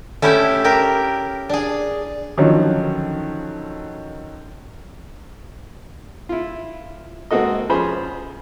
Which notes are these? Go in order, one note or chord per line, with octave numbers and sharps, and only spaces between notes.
A3 C#4 E4 G4 E5 G5
G4 A#4 G5
D4 G#4
D3 D#3 F3 F#3 C#4
E4 F4
G#3 A#3 C4 F#4 A4 D#5
F3 C#4 G#4 C5 B5